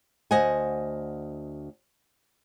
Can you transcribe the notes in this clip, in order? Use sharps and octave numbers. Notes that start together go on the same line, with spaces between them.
D2 C5 D#5 F#5 G#5